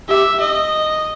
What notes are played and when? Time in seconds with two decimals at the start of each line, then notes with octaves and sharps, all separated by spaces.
0.09 G4 E5
0.40 D#5